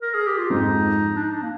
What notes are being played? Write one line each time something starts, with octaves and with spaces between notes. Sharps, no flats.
A#4
G#4
G4
F4
F2 G#2 D#4
D4
D#4
D4
A#3